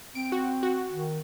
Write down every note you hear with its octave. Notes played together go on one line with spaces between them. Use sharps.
C4 D7
F#4
F#4
D#3